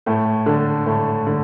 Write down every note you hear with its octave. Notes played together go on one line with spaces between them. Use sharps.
A2 A3
D3 D4
A2 A3
D3